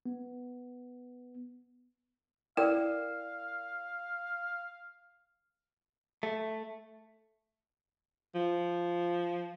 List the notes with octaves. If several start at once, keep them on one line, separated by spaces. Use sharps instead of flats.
B3
E4 A#4 D5 F5 G5
A3
F3